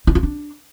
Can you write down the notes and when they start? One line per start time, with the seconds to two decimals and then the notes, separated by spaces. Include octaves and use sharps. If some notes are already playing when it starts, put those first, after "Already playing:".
0.07 E4
0.15 F4
0.23 D4